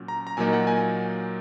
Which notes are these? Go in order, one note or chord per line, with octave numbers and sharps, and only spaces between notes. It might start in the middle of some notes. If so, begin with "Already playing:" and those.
Already playing: A#2 F#3 C#4
A#5
A#5
A#2 F#3 A#3 D#4 G#5
F#5
G#5